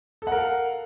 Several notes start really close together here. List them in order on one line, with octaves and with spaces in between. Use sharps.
A4 F#5 A#4 F5